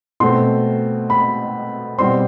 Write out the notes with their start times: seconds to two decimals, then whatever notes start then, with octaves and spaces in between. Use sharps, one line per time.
0.20 B2 A3 C4 C6
1.10 B5
1.98 B2 G3 C4 C6